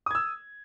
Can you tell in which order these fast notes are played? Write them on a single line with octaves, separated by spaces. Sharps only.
D#6 G#6 E6